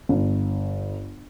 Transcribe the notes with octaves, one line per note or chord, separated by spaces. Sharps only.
G1